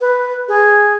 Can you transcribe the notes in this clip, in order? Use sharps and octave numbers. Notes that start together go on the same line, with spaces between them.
B4
G#4